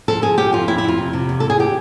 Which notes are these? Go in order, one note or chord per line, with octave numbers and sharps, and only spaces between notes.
F3 A4
F3 G#4
F3 G4
F2 F4
F2 E4
E4
F2 F4
C3
C3
E2
E2 A4
G#4
E3 G4